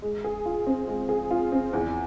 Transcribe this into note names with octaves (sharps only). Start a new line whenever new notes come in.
G#3
G#4
F4
C4
G#3
G#4
F4
C4
E2